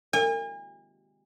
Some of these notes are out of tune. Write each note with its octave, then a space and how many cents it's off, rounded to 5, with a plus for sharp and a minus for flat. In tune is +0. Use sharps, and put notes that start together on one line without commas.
G#5 -40